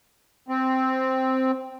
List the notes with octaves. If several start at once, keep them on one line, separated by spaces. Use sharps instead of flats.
C4